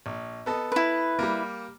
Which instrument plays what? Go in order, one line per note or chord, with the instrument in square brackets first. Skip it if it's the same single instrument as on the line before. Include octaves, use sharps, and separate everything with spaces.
[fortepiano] A#1
B3 A4 D#5
[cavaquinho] E4 B4
[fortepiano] G3 A#3